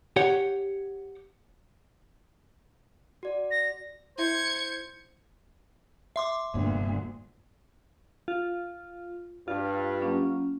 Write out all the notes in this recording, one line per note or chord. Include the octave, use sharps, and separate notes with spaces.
G4 C#5 F#5
F#4 D5
A#6
E4 C5 E5 G#6 C#7
E5 C6 D6
F1 D2 G2 A#2 B3
F4
G2 F4
F#3 A#3 C#4